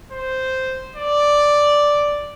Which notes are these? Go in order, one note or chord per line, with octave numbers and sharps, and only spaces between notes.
C5
D5